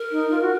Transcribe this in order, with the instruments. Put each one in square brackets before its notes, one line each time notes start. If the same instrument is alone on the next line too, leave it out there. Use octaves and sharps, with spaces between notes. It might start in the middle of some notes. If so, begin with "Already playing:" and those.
Already playing: [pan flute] A#4
[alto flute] D#4
F4
F#4